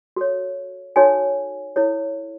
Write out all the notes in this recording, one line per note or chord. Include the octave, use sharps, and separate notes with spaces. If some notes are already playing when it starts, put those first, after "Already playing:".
F#4 A4 C#5
D#4 F#4 A4 C#5 G#5
E4 A4 C#5